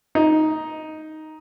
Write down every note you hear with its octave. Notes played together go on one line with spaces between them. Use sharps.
D#4